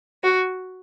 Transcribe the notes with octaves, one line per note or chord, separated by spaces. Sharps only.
F#4